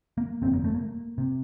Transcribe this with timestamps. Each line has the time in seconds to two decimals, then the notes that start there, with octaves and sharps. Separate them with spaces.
0.18 A#3
0.42 G1 F2 C3 C4
0.53 A#3
0.64 A3
0.74 A#3
1.18 C3